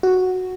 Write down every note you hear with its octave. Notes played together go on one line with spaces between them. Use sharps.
F#4